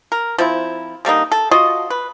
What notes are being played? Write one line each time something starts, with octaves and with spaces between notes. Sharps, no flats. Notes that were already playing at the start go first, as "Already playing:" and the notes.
A#4
F3 C4 E4
D3 G3 A#3 D#4
A4
F4 F#4 D#5
B4